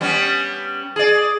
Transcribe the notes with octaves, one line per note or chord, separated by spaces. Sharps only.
G3 B3 C#4
G#4 D5